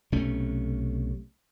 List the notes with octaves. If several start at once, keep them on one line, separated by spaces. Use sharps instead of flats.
B1 C3 A3 C#4